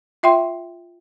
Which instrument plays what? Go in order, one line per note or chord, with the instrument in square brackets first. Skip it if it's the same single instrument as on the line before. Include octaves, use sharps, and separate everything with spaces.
[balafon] F4 E5 G5 C6